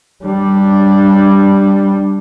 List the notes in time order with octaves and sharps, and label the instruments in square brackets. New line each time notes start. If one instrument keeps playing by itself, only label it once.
[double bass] G3 D4